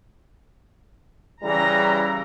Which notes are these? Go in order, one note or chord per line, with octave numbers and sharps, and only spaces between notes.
C#3 E3 G3 A#5